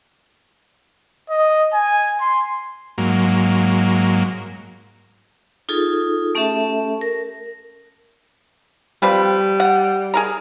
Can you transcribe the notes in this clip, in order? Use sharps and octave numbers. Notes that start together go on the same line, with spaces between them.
D#5
G#5
C6
G#2 F#3 A#3
D#4 F4 G#4 A4
A3 C#4 G4 A4 E5 A5
A#4
F3 G3 C4 B4
F#5
G#4 A#4 A#5